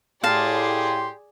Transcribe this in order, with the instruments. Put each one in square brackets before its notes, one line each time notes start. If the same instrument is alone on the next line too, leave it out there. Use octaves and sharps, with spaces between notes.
[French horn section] A2 [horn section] G4 C6 [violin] G#4 D5 [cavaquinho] F5 A5